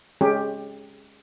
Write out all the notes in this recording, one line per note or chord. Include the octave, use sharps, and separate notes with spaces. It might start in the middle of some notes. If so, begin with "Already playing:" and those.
G#3 C#4 G4